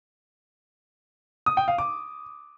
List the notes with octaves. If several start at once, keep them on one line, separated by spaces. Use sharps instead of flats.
D#6
G5
F5
D6